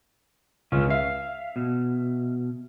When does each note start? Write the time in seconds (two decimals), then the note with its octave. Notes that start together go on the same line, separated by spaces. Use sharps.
0.72 C#2 C#3 C#4 F4
0.90 E5 F5
1.56 B2